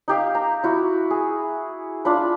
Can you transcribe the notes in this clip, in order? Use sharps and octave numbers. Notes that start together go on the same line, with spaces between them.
D#4 G4 F5
A#5
E4 F#4
G#4
D4 F4 B5